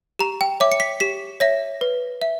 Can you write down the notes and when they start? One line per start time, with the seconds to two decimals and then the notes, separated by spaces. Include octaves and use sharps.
0.19 G4 A#5
0.41 G5
0.60 C#5 E5 D6
0.72 C#7
0.80 B6
1.00 G4 B6
1.40 C#5 E5 A#6
1.81 B4
2.22 E5